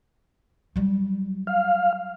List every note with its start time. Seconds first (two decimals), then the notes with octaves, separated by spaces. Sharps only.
0.76 F#3 G3
1.47 F5